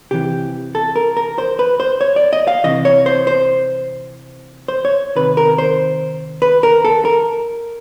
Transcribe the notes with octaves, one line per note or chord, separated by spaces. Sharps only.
C3 E3 G4
A4
A#4
A#4
C5
B4
C5
C#5
D5
D#5
F5
C3 E3 D#5
C#5
C5
C5
C5
C#5
C3 D#3 B4
A#4
C5
B4
A#4
A4
A#4